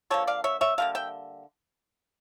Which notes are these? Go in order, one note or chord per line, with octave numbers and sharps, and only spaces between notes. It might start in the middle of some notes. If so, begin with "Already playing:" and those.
D3 F3 A#3 A4 C#5
D5 F5
C#5 E5
C#5 E5
D3 G3 A#3 F5
E5 G5